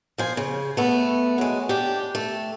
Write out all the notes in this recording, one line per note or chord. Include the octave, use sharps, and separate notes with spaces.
F3 C5 G#5
C#3
A3 B3
F#3 G#3
D4 G4
A3